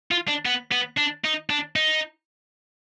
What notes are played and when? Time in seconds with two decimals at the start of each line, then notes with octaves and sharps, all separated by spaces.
0.11 F4
0.28 D4
0.45 B3
0.72 B3
0.98 D4
1.25 D#4
1.50 D4
1.76 D#4